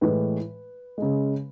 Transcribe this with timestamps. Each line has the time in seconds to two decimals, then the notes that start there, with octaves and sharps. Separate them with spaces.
0.01 A2 E3 G#3 B4
0.98 C#3 G#3